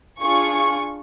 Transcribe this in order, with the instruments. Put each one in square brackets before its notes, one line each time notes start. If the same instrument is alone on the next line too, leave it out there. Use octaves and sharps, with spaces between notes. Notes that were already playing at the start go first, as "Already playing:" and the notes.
[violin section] D4 F4 G#4 C#6